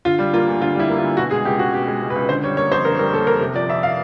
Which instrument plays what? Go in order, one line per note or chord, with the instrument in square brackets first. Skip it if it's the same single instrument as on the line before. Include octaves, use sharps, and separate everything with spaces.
[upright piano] D3 F4
G3
A#3 F4
D2
D3 F4
G3 E4
A#3
F4
D2
B2 F#4
G#3 G#4
C#2 G4
C#2 F#4
B2 G4
G#3
C#2
B4
C#2
D3 C5
G3 C#5
A#3 C#5
F2 C5
D3 A#4
G3 A#4
A#3 A4
F2 A#4
C3
F3 D5
F2 E5
F5